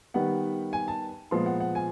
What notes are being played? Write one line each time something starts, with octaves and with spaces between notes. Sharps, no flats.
D#3 G3 B3 F#5
G#5
A5
A#2 F3 G#3 B3 C6
F#5
F#5
G#5